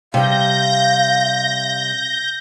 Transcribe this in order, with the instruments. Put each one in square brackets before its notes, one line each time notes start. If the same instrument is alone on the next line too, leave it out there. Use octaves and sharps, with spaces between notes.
[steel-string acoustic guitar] C3 G3 [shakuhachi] F5 [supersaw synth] G6 A#6